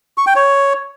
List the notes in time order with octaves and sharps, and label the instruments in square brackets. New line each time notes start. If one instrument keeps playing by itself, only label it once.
[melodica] C#6
G5
C#5